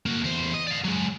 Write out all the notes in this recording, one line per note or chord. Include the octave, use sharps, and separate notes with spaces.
A#3 F#4
E2 C5
D#5
D5 F5
F#3 G#3